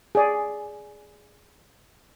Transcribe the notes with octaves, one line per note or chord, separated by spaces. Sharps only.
G#4 D5